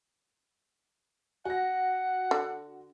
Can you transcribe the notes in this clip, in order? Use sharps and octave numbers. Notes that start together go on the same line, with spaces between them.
F#4 F#5 A#6
D3